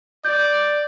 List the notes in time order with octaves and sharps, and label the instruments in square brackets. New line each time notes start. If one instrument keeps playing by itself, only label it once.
[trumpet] D5 [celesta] G6